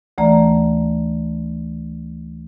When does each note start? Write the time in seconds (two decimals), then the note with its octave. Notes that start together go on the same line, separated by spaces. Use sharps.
0.18 D2 E3 A3 D5 A#5